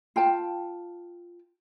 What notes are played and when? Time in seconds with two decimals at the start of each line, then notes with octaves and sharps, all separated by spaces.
0.16 F4 G5 A5